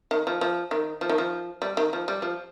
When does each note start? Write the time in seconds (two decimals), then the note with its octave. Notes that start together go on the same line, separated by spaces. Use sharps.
0.11 D#3
0.27 F3
0.41 F3
0.71 D#3
1.01 F3
1.09 D#3
1.18 F3
1.62 G3
1.77 D#3
1.93 F3
2.08 G3
2.22 F3